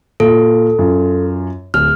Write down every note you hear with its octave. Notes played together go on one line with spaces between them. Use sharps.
A#2 F4 A4
F#2 F4
D1 F6